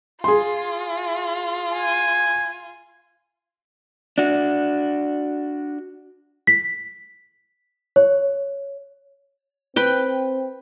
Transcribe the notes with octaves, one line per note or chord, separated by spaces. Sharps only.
F4 G#4 C6
G#5
D4 F#4
B6
C#5
C4 B4 G5